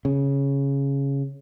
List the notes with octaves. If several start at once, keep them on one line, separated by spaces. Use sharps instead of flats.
C#3